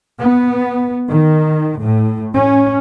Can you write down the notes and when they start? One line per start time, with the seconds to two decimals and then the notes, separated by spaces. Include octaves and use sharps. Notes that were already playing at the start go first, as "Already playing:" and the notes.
0.20 B3
1.08 D#3
1.78 A2
2.34 C#4